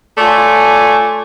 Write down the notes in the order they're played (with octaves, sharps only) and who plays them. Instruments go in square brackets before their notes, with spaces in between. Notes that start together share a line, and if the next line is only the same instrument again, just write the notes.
[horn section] A3 F4 C#5 D5 G#5